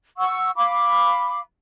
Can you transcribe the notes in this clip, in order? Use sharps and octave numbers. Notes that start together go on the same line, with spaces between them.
F#5 C#6 E6
F5 B5 D6